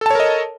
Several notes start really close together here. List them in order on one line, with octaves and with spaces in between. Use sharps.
A4 A5 C#5 A#4 D#5